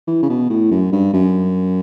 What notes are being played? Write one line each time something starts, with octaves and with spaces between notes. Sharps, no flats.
E3
C#3
B2
A2
F#2
G2
F#2